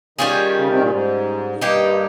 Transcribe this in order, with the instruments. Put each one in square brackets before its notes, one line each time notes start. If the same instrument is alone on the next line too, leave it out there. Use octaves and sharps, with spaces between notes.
[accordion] D#3 [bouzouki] G3 C#4 F4 G#4
[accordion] C#3
C3
A#2
G#2
[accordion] G2 [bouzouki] D#3 A#3 D#4 G4